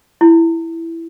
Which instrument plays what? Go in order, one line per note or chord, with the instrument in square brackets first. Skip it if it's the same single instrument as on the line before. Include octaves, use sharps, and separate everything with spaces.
[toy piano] E4